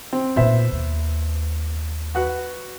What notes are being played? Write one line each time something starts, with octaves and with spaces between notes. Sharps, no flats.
C4
A#2 B3 D#4 C5 E5
D#2
F#4 B4 F#5